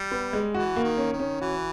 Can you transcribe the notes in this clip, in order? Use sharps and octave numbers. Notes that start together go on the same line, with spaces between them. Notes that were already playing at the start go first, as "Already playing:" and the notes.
Already playing: G3
B3
G#3
E3 F#4
A#3
D#3
C#4
D#3
C#4
E3 F#4